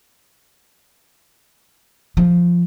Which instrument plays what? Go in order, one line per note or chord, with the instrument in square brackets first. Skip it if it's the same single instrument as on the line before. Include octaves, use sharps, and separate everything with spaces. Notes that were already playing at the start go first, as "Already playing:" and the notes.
[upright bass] F3